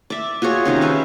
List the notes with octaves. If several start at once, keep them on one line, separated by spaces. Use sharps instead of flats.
D5 E5
F4 F#4 G#4 C#5
C3 D#3 C#4
B4 E5 F5